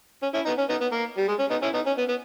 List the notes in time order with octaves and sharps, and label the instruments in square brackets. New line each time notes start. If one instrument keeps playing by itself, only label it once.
[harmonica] C#4
C#4 E4
B3 D#4
C#4
B3 D#4
B3
A#3
G3
G#3
C#4
B3 D#4
C#4 E4
B3 D#4
C#4
B3
B3